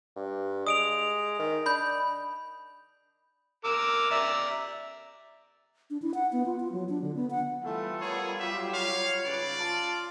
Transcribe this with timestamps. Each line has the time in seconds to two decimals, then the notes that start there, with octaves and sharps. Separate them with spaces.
0.16 G2
0.67 G#3 D#6 D7 F7
1.39 D#3
1.66 D4 B5 G6
3.65 A#4 D6 E6
4.11 D5 E5 A#5
5.90 D4
6.02 E4
6.14 F#5
6.33 B3
6.46 F4
6.60 F4
6.72 F#3
6.89 D4
7.02 D3
7.16 B3
7.30 F#5
7.65 E3 G3 A3 F4 A4
8.01 B3 G#4 A#4 C#5
8.39 F#3 G4 E5
8.74 C#5 F5
9.25 G#2 C#3 B4 D5
9.60 F4 A5